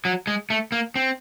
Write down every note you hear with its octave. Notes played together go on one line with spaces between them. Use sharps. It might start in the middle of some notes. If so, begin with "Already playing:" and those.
F#3
G#3
A3
A#3
C4